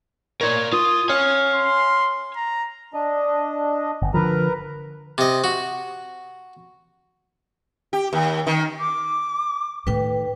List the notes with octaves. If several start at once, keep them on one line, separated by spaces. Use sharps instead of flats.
A#4 C#5 D5
F4 D#6
C#5 F5 G#5
C6
A#5
D4 D#5
G1
D3 F3 A#4 B4 A#5
C3 D#5
F#4
G4
D#2
D#3
D6
A2 D#3 B4 G5